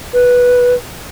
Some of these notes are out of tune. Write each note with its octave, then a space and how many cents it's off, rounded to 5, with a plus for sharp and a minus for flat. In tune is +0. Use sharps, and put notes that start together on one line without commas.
B4 -10